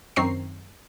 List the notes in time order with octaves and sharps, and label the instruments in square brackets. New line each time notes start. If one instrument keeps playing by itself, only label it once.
[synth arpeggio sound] F#2 D#3 C4 A#5 C#6 C7